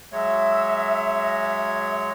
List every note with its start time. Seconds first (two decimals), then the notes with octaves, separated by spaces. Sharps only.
0.12 F#3 G#3 C#5 E5